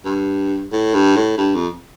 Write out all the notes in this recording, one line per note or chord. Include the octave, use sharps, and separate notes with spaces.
G2
A2
G2
A2
G2
F2